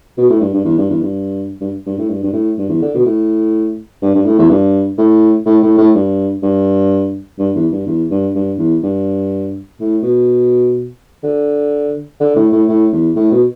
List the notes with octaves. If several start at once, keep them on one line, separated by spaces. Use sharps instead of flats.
B2
A2
G2
G2
E2
G2
E2
G2
G2
G2
A2
G2
G2
A2
G2
E2
D3
B2
A2
G2
G2
A2
E2
G2
A2
A2
A2
A2
G2
G2
G2
E2
G2
E2
G2
G2
E2
G2
A2
B2
D3
D3
A2
A2
A2
E2
A2
B2